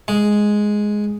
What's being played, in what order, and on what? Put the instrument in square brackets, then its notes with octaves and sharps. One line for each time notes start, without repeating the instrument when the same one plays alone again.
[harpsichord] G#3